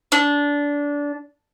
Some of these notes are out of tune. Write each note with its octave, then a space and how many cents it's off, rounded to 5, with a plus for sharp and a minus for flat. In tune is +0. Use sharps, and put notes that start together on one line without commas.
D4 -20